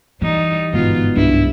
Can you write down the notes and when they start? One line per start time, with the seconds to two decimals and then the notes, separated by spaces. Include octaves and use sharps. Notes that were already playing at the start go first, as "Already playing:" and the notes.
0.22 E3 G3 D#4
0.73 G1 G#2 B2 B3 F4
1.16 C2 G2 E4